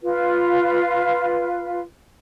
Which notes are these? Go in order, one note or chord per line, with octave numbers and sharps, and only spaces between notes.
F4 B4